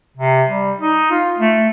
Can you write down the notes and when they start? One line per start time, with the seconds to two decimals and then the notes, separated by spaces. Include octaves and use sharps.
0.17 C3
0.49 G3
0.80 D#4
1.11 F4
1.38 A3